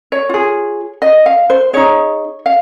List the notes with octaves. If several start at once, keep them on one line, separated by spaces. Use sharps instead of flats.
C#5
F4 G#4
D#5
F5
C5
D#4 G#4 C#5
F5